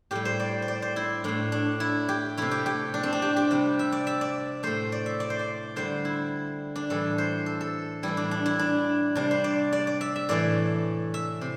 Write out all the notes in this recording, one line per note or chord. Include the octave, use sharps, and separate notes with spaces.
A2 G3 G4
C5
D5
C5
D5
C5
E4
A2 A3 D4
D4
E4
G4
C3 A3 E4
G4
G4
D4
C4
D4
G4
G4
C3 G3
E5
D5
E5
D5
A2 A3 C5
D5
E5
D5
C5
D5
D3 G3 C5
E4
D4
A2 E3 G3 A4
C5
A4
A4
A2 E3 G3 E4
D4
D4
E4
D4
C3 G3 D4
C5
D5
D5
D5
E5
E5
A2 E3 A3 D5
E5
C3